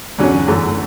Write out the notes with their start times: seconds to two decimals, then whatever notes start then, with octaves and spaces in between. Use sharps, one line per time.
0.18 E2 D3 F#3 C#4
0.48 F#2 E3 A3